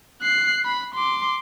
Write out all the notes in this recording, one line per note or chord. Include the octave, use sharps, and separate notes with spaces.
F#6 C7
B5
C6 D6